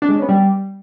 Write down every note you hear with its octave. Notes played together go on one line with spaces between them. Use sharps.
D4
G#3
C#4
B3
G3